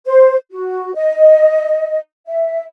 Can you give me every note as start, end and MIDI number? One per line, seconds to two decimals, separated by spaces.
0.06 0.36 72
0.52 0.92 66
0.95 1.98 75
2.27 2.63 76